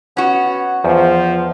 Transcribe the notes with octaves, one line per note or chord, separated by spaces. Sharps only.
B3 C#4 F#4
E2 F3 C5